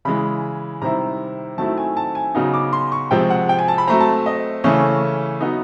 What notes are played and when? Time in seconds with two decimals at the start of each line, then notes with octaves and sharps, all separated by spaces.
0.05 C#3 E3 G#3 B5
0.82 C3 D#3 G3 C4 E4 A#5
1.58 D#3 F#3 A3 C4 E4 A5
1.78 G#5
1.97 A5
2.15 G#5
2.35 C#3 F#3 B3 D#4
2.54 D6
2.73 C6
2.92 C#6
3.11 C3 F3 G#3 C4 G5
3.30 F#5
3.49 G5
3.59 G#5
3.68 A5
3.78 B5
3.88 F#3 A3 C4 A#5
4.00 A5
4.26 D#5
4.64 C#3 E3 A3 C#4
5.40 F#3 B3 D#4